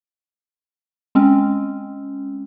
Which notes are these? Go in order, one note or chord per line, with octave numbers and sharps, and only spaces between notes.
G#3 C4 C#4